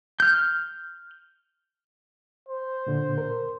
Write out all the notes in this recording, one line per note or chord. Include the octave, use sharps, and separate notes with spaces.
F6 G6
C5
A#2 D3
A#4